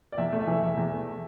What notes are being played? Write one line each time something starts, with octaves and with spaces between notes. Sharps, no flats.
D5
E2 E5
A3
E5
E3
E2 E5
E2
A3